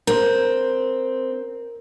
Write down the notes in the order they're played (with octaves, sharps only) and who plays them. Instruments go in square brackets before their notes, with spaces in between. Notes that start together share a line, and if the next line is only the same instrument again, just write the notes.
[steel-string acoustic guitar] C4 [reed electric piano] A#4